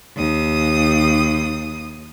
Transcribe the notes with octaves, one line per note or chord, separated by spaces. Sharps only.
D#2 D#6